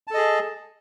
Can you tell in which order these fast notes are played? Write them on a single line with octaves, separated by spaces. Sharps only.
A5 A4 D#5 G#4